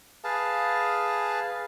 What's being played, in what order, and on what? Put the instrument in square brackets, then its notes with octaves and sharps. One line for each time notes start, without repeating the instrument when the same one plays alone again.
[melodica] G#4 B4 F5 A5